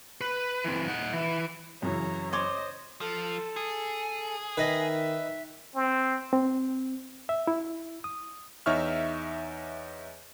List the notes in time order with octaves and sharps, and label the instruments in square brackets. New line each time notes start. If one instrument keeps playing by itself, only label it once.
[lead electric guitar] B4
E3 C4
D#4 F#5
E3
[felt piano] F#2 C#3 E3 [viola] C#5 A#5
[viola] C5 D#5 [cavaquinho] C#5 C6 D6
[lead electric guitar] F3 [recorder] A4
[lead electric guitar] G#4
[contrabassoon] D#3 [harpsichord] B4 D#5 [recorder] E5
[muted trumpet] C4
[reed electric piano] C4
E5
E4
D#6
[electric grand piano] E2 D#4 C#5 E5 C#6 F6